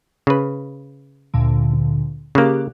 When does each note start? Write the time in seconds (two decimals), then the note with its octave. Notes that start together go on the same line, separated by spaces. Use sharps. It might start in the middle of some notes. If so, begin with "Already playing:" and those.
0.27 C#3 B4
1.34 D2 A#2 D3
2.35 C#3 A#3 G4 D6 F#6